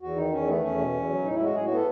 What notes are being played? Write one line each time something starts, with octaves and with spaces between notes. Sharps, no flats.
E2 F#4
D#3 D#4
E2 C#4
A3 B3
E2 C#4
B2
E2
F#3
A2 D#4
E4
G#3 F#4
A2 G#4
F#4
B3 A4